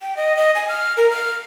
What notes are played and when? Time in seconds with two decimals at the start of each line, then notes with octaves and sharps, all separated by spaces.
0.02 G5
0.17 D#5
0.37 D#5
0.55 G#5
0.69 F6
0.97 A#4
1.11 F6